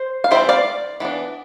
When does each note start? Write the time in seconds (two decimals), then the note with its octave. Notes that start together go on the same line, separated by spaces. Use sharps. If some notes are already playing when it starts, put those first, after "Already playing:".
Already playing: C5
0.24 F5
0.31 E3 G3 C4 C5 E5
0.49 D5 F5
1.00 E3 B3 D4